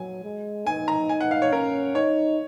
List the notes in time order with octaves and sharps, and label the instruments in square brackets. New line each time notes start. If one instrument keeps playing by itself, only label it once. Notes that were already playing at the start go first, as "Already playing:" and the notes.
Already playing: [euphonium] F#3 [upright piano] G#5
[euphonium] G#3
[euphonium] D#4 [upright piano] G#5
[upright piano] A#5
G#5
F#5
F5
C#5
[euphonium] C#4 [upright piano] A#4
[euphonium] D#4 [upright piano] C#5